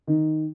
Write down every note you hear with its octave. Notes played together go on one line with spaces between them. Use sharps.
D#3